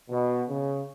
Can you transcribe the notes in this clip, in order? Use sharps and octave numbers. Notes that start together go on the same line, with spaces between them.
B2
C#3